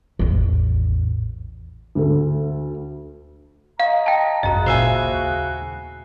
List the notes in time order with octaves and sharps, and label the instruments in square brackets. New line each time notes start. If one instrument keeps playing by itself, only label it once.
[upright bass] A1 E2
[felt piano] D2 A4
[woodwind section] D#5 A#5 [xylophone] F5
[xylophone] G5 A5
[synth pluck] G#1 C#2 F#2 [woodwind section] C#3 F#4 [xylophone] D#5 A#5
[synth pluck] D#2 A#2 [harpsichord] C5 E5 G#5